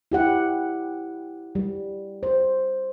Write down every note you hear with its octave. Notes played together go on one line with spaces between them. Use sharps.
E4 G4 F#5
G3
C5